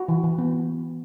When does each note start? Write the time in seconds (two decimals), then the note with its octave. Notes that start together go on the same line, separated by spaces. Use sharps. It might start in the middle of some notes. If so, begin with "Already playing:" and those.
Already playing: F#4
0.08 E3
0.23 E3
0.38 B3